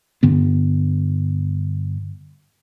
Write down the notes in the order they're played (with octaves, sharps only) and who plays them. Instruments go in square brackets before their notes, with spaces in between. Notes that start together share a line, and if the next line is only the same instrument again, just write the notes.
[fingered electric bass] G2 D3 B3